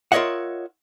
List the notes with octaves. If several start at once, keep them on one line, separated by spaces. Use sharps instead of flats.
F4 A#4 C#5 D#5 E5 F#5